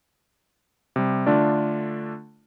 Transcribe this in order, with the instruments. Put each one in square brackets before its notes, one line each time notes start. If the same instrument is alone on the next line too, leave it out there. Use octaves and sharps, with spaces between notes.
[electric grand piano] C3 G3
D3 A3 D4 F4 D5